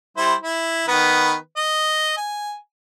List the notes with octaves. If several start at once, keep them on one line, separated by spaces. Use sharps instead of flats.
G3 E4 C5
E4
D#3 B3 B4
D#5
G#5